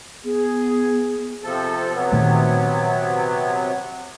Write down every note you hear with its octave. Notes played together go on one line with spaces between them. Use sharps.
B3 G#4
C3 F3 A4
C3 F#3 B3
A#2 D#3 A3